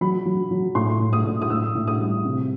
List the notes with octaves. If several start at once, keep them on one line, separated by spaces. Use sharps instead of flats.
F#3 B5
F#3
F#3
A2 C6
A2
D#6
A2
D#6
A2 E6
A2
D#6
G3
C3